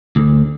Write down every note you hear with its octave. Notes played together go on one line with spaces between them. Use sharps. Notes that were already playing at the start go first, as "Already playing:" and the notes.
D2